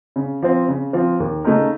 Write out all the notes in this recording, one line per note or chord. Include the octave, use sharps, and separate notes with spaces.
C#3
F3 C4
C#3
F3 C4
D#2
C#3 A3 D#4 A#4